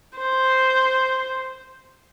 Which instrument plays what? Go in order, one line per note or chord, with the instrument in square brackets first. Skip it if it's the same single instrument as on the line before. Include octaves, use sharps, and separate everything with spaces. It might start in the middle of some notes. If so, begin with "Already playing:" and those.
[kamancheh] C5